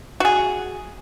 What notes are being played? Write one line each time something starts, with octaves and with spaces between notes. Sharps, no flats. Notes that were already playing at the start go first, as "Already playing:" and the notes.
F#4 G#4